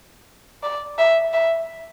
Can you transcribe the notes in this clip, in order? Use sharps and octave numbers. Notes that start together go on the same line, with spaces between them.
D5
E5
E5